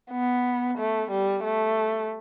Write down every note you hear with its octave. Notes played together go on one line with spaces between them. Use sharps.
B3
A3
G3
A3